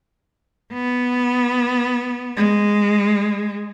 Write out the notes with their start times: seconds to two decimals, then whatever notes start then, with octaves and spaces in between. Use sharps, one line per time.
0.73 B3
2.37 G#3